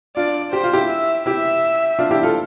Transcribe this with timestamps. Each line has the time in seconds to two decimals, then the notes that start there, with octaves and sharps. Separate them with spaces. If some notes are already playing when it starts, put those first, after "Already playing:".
0.16 D4 F4 D5
0.53 G4 C5
0.64 F4
0.73 E4 G4
0.90 E5
1.26 E4 G4 E5
1.99 D4 F4
2.11 E4 G4
2.23 F4 A4